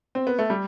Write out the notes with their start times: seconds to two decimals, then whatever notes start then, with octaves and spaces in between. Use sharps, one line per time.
0.15 C4
0.27 B3
0.39 A3
0.50 G3